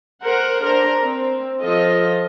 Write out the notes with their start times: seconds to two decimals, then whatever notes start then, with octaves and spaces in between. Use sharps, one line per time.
0.21 A#4 C5 F#5
0.62 D4 A#4 C5 A#5
1.02 C4
1.62 F3 F4 A4 D#5